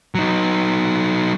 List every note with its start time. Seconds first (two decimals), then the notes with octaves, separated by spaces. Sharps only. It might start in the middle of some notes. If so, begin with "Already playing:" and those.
0.15 F#3 D#4